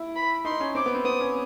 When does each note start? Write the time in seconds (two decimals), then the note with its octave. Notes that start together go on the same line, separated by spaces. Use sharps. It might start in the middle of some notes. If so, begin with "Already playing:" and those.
Already playing: E4
0.16 B5
0.45 D#4 C6
0.60 C#4
0.75 C4 D6
0.86 B3
0.95 C4
1.05 B3 D#6
1.20 C#4